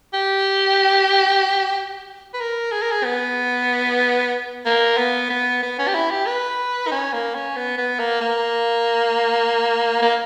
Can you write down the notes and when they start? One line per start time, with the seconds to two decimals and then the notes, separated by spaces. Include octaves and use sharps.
0.14 G4
2.34 B4
2.40 A#4
2.72 G#4
2.82 A#4
2.91 G#4
3.04 B3
4.66 A#3
4.97 B3
5.30 B3
5.62 B3
5.79 C#4
5.88 G4
5.95 E4
6.10 G4
6.26 B4
6.87 D#4
6.91 C#4
7.13 A#3
7.35 C#4
7.56 B3
7.77 B3
7.99 A#3
8.21 A#3
10.02 A#3